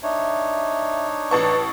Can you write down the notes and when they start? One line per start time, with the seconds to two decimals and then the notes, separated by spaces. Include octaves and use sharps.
0.03 D4 D#4 C#5 E5
1.31 A1 B4 A5 C#6